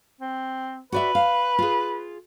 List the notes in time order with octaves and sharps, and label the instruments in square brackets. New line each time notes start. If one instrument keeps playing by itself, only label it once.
[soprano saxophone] C4
[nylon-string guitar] F#4 D5 E5 [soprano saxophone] B4
[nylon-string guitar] F5
F4 G#4